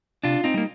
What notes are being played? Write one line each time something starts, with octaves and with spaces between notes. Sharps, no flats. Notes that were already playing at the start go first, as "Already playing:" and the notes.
C3 D4 F4
C4 D#4
G3 A#3